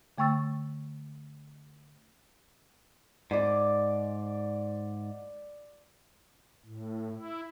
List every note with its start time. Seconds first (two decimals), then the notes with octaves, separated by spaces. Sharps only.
0.18 D3 A3 G5 C#6 E6 A6
3.31 G#2 D5 F5 D6
6.66 A2
7.15 E4